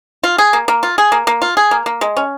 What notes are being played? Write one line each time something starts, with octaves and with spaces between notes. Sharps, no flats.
F4
G#4
A#3
A#3
F4
G#4
A#3
A#3
F4
G#4
A#3
A#3
G#3
C#4